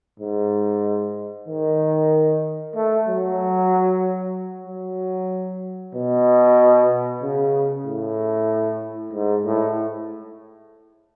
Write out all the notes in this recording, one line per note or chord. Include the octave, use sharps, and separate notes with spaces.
G#2
D#3
A3
F#3
F#3
B2
C#3
A2
G#2
A2